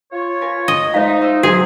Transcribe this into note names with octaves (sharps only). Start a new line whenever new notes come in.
F4 C#5
A#4 B4 G#5
D#5
G#3 D#4 C5 E5 F5
F4 C5 E6
C3 F#3 F4 F#4 G#4